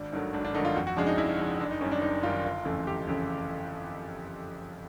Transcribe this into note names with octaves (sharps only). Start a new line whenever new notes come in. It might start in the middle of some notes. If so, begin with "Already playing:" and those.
Already playing: G#1 D4
G2 D#3 F#3 A3
G#1 D4
D4
G2 D#3 F#3 A3 D#4
F4
F2 F#4
F#4
C#3 F3 G#3 D4
D#4
F2 E4
C#3 F3 G#3
F#1 D4
D#4
F#2 D#3 G3 C#4
D4
F#1 D#4
F#2 D#3 G3 F4
G1 F4
F2 C#3 E3 A3
G1 G4
F2 C#3 E3 A3